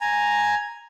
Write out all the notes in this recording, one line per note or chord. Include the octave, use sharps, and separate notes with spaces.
G#5 A#5